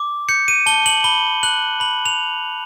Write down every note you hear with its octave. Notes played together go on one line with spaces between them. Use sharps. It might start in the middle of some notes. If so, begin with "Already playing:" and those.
Already playing: D6
G6 C#7
D#7
A5 G7
F#7
B5 G7
F#6 F#7
B5 F#7
F7